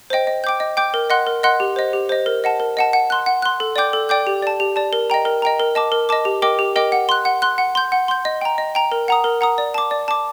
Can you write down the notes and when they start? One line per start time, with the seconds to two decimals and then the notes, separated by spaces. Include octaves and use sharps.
0.10 C5 D#5 G5
0.27 D#5
0.44 G5 D6 G6
0.60 D#5
0.77 G5 D6 G6
0.94 A#4
1.10 D#5 F#5 C6 F#6
1.27 A#4
1.43 D#5 F#5 C6 F#6
1.60 G4
1.76 C5 D#5
1.93 G4
2.09 C5 D#5
2.26 A#4
2.44 D#5 F#5 A5
2.60 A#4
2.77 D#5 F#5 A5
2.93 F#5
3.10 C6 F#6
3.26 F#5
3.42 C6 F#6
3.60 A4
3.76 D5 G5 D6 G6
3.93 A4
4.09 D5 G5 D6 G6
4.27 G4
4.42 D5 A5
4.60 G4
4.76 D5 A5
4.93 A#4
5.10 D#5 G5 A#5
5.25 A#4
5.42 D#5 G5 A#5
5.60 A#4
5.75 D#5 A5 D6
5.92 A#4
6.09 D#5 A5 D6
6.25 G4
6.42 A#4 D#5 G5 D6
6.59 G4
6.76 A#4 D#5 G5 D6
6.92 F#5
7.09 C6 F#6
7.25 F#5
7.42 C6 F#6
7.58 F#5
7.75 C6 G6
7.92 F#5
8.08 C6 G6
8.25 D#5
8.41 G5 A#5
8.58 D#5
8.75 G5 A#5
8.92 A#4
9.08 F#5 A#5 D#6
9.24 A#4
9.41 F#5 A#5 D#6
9.58 D5
9.74 A5 D6
9.91 D5
10.08 A5 D6